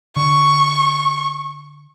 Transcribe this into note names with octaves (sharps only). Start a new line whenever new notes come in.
D3 C#6